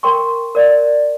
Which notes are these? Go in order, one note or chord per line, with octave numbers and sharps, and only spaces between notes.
A#4 G5 C6 C#6
A#4 D5